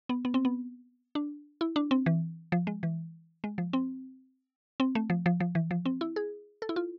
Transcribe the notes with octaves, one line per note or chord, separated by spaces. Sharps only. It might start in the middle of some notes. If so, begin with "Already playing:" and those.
B3
B3
C4
B3
D4
E4
D4
C4
E3
F3
G#3
E3
G#3
F3
C4
C4
A3
F3
F3
F3
E3
F3
C4
E4
G#4
A4
E4
F4